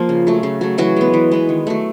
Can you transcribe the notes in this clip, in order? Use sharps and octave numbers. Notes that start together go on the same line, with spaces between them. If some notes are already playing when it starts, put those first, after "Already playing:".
Already playing: F3 A#3 F4
C#3
F#3 A3
C#3
F#3 A3
E3 F#3 F#4
G#3 B3
E3
G#3 B3
D#3
F#3 A3